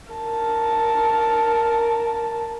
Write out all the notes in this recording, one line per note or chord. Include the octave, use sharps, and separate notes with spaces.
A#4 A5